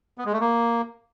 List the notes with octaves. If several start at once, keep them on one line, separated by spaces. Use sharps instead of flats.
B3
G#3
A3
A#3